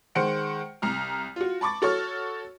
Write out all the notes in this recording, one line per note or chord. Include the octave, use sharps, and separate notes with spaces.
D#3 G#3 C5 F#5 C#7 D7
C2 A#5 F6
F4 F#4
A5 B5 C#6 D6 A6
F#4 A4 C#5 C#6 F6